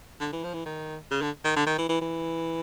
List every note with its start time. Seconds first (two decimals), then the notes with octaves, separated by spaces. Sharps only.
0.20 D3
0.32 E3
0.44 F3
0.54 E3
0.65 D#3
1.11 C#3
1.22 D3
1.45 D#3
1.56 D3
1.67 D#3
1.78 E3
1.89 E3
2.01 E3